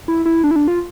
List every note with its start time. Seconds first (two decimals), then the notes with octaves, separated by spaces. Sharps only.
0.08 E4
0.26 E4
0.44 D4
0.51 E4
0.56 D4
0.68 F4